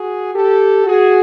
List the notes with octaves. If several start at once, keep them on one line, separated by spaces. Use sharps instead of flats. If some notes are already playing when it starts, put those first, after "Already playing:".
Already playing: F#4 G#4
G4 A4
F#4 G#4